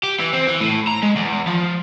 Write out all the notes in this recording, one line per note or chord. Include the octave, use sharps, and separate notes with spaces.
G4
E3
C4
E3
A2
A#5
G#3
E2
F3